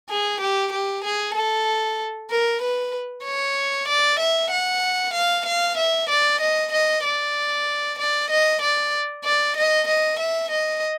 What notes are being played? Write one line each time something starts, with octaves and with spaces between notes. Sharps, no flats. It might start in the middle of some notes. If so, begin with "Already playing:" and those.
G#4
G4
G4
G#4
A4
A#4
B4
C#5
D5
E5
F#5
F5
F5
E5
D5
D#5
D#5
D5
D5
D#5
D5
D5
D#5
D#5
E5
D#5